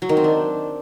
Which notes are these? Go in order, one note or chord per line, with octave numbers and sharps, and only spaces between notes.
F#3
D#3
C4
D4